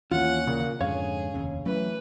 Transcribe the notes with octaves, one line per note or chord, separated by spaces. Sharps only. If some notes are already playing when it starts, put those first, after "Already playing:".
D#2 E3 A#3 C#4 F4 F#5
A#2 C#3
F2 G#2 D3 C#4 G#4 C#5 F5
F1 D#2 C#3
E3 F#3 A3 C#4 B4